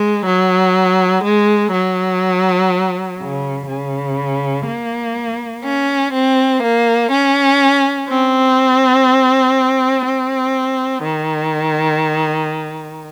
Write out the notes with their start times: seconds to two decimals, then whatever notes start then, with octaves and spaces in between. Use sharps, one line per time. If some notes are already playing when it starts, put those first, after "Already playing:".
Already playing: G#3
0.25 F#3
1.23 G#3
1.72 F#3
3.20 C#3
3.68 C#3
4.67 A#3
5.64 C#4
6.12 C4
6.62 A#3
7.11 C#4
8.09 C4
10.04 C4
11.03 D#3